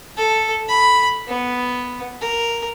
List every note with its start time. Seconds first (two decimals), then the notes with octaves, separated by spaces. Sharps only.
0.17 A4
0.68 B5
1.27 B3
2.21 A#4